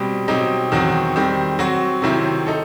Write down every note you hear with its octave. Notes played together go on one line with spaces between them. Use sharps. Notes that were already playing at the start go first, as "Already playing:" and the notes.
Already playing: B2 G3 C4
B2 F#3 C4 D#4 G4
E2 D#3 F#3 C4 F#4
D#3 G3 C4
F#3 C4 F#4
C3 D#3 F#3 C4 E4
D#4 A4